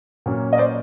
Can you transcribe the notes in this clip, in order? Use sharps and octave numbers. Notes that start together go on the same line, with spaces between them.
A#2 F#3 A#3 C#4
D#5
C5 D5